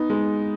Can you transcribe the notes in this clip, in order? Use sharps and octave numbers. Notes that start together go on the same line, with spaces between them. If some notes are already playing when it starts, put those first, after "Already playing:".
Already playing: B3 D#4
G#3